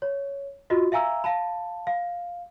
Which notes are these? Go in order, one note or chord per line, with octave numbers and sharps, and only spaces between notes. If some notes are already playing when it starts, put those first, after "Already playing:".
C#5
F4 F#4 D#5
E5 F5 G#5 A#5 E6
F5 A5 B5
F5